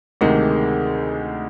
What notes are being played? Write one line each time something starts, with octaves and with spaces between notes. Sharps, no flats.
D2 C3 D#3 G#3 G#4 A#4